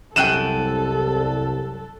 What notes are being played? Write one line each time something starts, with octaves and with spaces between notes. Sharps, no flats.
C2 F#2 A4 G5 F#6 D#7 E7